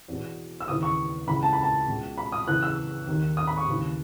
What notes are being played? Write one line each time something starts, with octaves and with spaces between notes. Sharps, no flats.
E2 B2
E6
D#2 C#3 E3 D#6
C#6
C#2 C#3 E3 B5
A5
B5
A5
C#2 B2
B5
D#6
E2 C#3 E3 F#6
E6
D#2 D#3
D#6
B5
C#6
D#2 C#3 E3